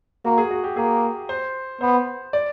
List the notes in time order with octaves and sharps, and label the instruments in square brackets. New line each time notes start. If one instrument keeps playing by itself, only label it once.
[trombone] A#3 [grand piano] F#4
[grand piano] G#4
F#4
G4
[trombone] A#3 [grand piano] G#4
[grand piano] C5
[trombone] B3 [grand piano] C5
[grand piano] D5